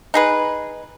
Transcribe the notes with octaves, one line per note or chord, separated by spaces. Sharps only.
D#4 G#4 B4